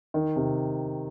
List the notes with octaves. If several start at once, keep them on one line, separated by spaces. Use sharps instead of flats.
D#3
C3